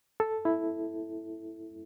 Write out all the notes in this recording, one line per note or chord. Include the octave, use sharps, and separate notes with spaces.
A4
E4